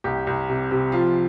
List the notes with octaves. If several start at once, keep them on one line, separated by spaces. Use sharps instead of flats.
C2 G4
C2
C3
C3
F3 F4